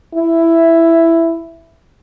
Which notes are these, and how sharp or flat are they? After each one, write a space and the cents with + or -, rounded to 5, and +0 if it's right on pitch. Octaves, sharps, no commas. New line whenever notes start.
E4 +5